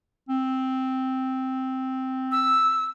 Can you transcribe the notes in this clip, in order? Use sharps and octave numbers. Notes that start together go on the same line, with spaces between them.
C4
E6